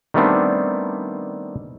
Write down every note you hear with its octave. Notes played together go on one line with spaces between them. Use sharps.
D#3 G3 A3 B3 C4 D4